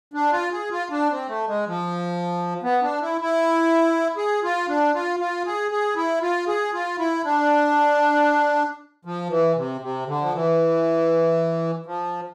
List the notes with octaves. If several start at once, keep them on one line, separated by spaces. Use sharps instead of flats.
D4
F4
G#4
F4
D4
C4
A3
G#3
F3
B3
D4
E4
E4
G#4
F4
D4
F4
F4
G#4
G#4
E4
F4
G#4
F4
E4
D4
F3
E3
C3
C3
D3
F3
E3
F3